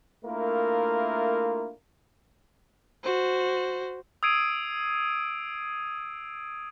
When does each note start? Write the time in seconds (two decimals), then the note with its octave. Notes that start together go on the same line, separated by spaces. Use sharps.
0.25 A3 A#3 D4 E4 F4 A#4
3.04 F#4 C5
4.23 D#6 E6 G#6 C7 D7 D#7